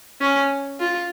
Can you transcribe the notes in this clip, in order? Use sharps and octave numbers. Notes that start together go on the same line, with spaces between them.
C#4
F4